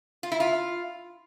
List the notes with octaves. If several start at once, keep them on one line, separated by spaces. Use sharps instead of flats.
F4
E4
F4